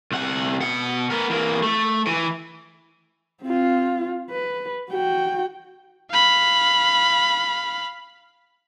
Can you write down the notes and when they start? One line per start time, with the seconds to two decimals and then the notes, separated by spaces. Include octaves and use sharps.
0.12 C2 F#5
0.60 B2 F#5
1.11 B3 A#4
1.31 E3 A#3
1.63 A3
2.07 E3
3.42 C4 F4
4.31 B4
4.91 F#4 G5
6.10 F5 B5